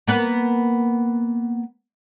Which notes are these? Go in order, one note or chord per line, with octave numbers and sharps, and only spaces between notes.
A#3 B3 B4